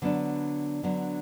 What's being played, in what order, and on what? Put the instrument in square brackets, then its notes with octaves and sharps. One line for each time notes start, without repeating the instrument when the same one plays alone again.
[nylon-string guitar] D3 F#3 B3 D4
D3 F#3 B3 D4